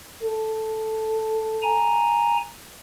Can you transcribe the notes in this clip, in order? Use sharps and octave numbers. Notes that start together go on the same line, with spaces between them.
A4
G#5 A#5